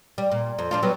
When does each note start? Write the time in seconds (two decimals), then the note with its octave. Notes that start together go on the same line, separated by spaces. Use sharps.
0.18 G3
0.32 A#2
0.59 F2
0.71 F3 D4 F4
0.83 F#3 G3 B3